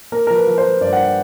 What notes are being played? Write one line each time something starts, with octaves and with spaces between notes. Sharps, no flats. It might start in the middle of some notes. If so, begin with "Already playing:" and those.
A#3 A#4
F3 A#4
B4
F3
C5
F3
G2 D5
F#5
G5